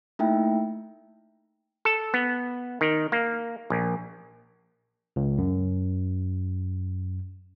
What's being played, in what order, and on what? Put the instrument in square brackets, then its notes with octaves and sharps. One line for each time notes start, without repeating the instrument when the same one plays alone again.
[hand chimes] A3 A#3 D#4 E4 E5 G5
[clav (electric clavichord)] A4
B3
D#3
A#3
A#1
[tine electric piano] C#2
F#2